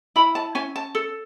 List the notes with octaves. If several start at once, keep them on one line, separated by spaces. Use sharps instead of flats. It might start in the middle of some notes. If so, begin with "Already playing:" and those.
E4 B5
A5
C#4 G#5
A5
A4